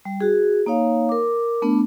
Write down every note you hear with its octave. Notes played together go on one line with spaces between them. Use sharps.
G3
F#4 G#4
A#3 D#4 C#5 F5
A#4 D6
A3 B3 D4